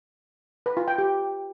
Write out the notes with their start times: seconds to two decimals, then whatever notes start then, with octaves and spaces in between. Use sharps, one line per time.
0.66 B4
0.77 F4
0.88 G5
0.98 G4